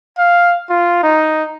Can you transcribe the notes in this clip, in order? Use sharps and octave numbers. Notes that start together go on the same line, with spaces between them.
F5
F4
D#4